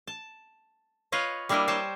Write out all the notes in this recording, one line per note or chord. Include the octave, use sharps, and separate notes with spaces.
A5
F4 B4 C#5 D#5 F5
G3 A#3 D4 E4 A#4 D#5
C5 C#5 D#5 G5 A5